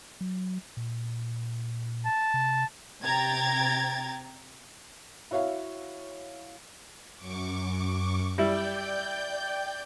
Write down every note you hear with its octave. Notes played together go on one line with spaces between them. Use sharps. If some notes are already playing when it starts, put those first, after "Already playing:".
F#3
A#2
A5
C3
C3 G5 A#5 G#6 A6
E4 F#4 C#5 E5 F5
F#2 C#6 D6
G3 E4 D5 G5 G6